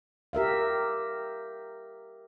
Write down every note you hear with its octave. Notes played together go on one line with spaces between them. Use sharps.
G4 A#4 E5 F5